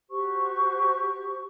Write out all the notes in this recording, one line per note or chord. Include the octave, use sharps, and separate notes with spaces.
F#4 G4 C5 C#6